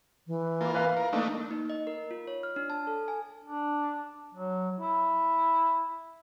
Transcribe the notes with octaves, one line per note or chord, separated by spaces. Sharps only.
E3
A#3 F4
B4 F5
A#4
A3 A#3 D4 D#4
A#3
D#4
D#5
A#4
F4
C#5
F6
D4
A5
A4
G#5
D4
F#3
E4